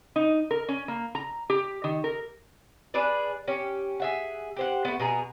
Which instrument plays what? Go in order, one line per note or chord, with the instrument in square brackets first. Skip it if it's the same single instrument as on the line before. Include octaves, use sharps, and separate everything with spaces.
[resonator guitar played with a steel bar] D#4
A#4
C#4
A#3
A#5
G4
D#3
A#4
[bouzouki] D4 G#4 B4 D5
C#4 G4
G#4 E5 F#5
G4 C5 F#5
A3 B3
B2 G#4 A#5